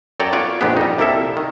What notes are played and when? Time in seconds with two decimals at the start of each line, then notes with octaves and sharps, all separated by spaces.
0.20 F#2 A4 C#5 D5 G5 A#5
0.32 B3 F4 C#5 D5
0.61 A#1 F2 G#2 B3 D4 G4
0.77 G3 D#4
0.98 C2 G3 A#3 E4 A4 E5
1.37 D#3